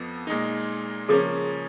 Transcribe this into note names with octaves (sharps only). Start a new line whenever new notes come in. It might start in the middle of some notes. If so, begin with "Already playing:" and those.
Already playing: F2 F3 B3
A#2 G#3 D#4
C#3 F3 A#3 C#4 G#4